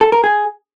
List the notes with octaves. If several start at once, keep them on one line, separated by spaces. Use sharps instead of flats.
A4
A#4
G#4